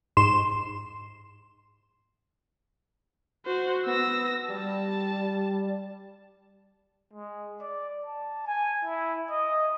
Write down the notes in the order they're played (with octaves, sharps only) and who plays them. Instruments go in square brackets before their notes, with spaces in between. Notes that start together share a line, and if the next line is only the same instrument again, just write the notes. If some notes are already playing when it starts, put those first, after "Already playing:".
[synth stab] G#2 C6 E7
[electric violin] F#4 C5
[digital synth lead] B3 [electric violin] E6 A#6
[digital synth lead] G3 [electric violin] A5
[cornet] G#3
D5
A5
G#5
E4
D#5